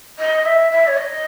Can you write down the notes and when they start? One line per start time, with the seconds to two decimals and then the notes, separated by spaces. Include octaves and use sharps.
0.19 D#5
0.45 E5
0.72 E5
0.87 C#5
0.97 D#5